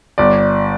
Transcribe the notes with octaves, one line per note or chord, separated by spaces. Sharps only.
G1 D5